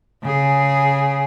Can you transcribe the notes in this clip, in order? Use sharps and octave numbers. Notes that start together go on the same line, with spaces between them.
C#3 G#4